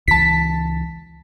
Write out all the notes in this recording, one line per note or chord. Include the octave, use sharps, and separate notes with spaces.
C#2 E3 A5 B6